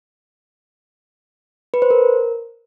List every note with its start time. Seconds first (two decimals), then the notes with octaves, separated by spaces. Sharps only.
1.74 B4
1.82 C5
1.90 A#4